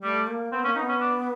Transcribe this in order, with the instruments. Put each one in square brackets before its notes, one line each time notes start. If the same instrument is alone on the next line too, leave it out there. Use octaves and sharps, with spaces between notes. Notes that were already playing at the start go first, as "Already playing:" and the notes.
[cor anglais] G3 [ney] A3
[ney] A#3
[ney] B3 [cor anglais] C4
[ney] A#3 [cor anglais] C#4
[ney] C#4 [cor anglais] D#4
[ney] B3
[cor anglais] C#4
D4